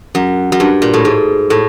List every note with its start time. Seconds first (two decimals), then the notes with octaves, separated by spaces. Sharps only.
0.15 F#2
0.52 F#2
0.60 G2
0.82 A#2
0.94 A2
1.05 G#2
1.50 A2